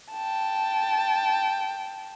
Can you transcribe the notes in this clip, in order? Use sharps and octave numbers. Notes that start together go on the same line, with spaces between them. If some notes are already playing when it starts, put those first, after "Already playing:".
G5 A5